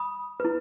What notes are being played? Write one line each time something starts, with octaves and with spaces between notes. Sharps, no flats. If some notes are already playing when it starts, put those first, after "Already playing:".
Already playing: B5 D#6
E4 B4